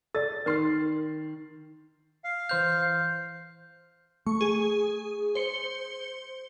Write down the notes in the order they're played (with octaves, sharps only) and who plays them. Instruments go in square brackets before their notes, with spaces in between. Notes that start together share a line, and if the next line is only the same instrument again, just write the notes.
[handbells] A4 D5 [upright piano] A6
[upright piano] D#3 C7 [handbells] A#4 C6 F6
[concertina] F5
[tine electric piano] E3 C5 F6 [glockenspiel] G6
[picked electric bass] A3 [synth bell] C#6
[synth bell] G#4
C5 C#7 G7